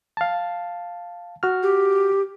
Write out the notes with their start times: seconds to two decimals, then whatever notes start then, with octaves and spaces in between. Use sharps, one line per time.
0.17 F5 A5
1.43 F#4 F6
1.63 G4